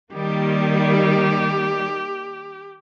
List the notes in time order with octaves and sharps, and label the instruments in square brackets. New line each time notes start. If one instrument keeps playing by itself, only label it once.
[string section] D#3 G3 A#3 [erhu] G4